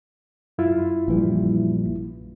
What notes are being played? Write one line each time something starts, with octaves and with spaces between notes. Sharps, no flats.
F#2 E4 F4
A#1 E3 G3